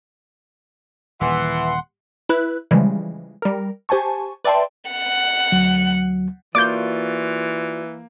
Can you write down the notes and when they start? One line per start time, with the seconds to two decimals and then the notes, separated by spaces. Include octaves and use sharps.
1.21 D#1 E3 F#5 C6
2.29 E4 B4 F#6
2.71 C#3 E3 F3 G3 G#3
3.42 G3 A#4
3.89 G4 C5 G#5 A5 C#6
4.45 B4 D5 E5 G5 A5 C6
4.91 F#5
5.52 D2 F#3
6.55 E3 A#3 F4 F#4 D5 D6 G6